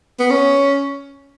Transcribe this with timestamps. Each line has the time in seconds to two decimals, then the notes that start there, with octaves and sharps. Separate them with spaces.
0.19 B3
0.30 C#4